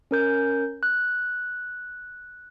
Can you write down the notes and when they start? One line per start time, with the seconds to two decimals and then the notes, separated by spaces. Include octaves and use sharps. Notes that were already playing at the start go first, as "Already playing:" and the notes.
0.11 C#4 A#4 G6
0.83 F#6